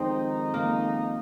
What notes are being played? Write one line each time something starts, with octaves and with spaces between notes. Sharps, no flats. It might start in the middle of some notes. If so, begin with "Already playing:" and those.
Already playing: F2 D#3 G#3 C4 D#4
A#3